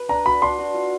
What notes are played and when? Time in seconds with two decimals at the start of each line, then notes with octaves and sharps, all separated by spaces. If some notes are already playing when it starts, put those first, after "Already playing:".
Already playing: B4
0.09 D4 A#5
0.25 F#4 B5
0.42 D4 C6
0.58 F#4
0.74 F4